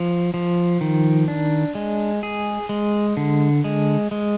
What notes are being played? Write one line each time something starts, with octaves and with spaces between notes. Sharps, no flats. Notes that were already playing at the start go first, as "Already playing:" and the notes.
Already playing: F3
F3
D#3
D4
G#3
G#4
G#3
D3
G#3
G#3